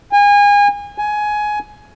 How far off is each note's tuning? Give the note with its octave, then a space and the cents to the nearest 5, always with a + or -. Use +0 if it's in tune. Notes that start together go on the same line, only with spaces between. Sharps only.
G#5 -30
G#5 +15